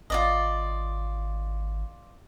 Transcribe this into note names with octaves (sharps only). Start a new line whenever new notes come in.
G#1 F4 D5 D#5